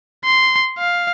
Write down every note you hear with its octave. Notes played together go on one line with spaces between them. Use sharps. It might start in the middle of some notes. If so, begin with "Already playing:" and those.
C6
F5